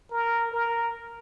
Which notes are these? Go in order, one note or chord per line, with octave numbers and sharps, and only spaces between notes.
A#4
A#4